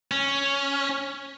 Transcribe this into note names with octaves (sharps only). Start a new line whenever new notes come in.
C#4